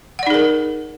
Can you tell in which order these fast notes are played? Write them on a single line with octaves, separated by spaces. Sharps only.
F#5 D5 D#4 G#4 A#4